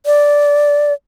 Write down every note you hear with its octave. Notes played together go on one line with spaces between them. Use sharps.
D5